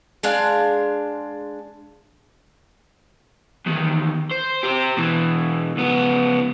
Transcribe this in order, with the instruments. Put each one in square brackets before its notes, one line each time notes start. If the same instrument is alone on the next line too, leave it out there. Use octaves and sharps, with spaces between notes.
[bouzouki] G#3 D4 F5
[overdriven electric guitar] E2 D#3
C5
G4 C5
B2 E3
C#2 B3